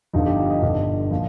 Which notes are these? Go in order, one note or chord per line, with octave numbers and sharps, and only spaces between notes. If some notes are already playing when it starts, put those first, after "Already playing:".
G1 G2 F3 D#4
G4
F4
D#5
G1 G2 D3
A#2 F3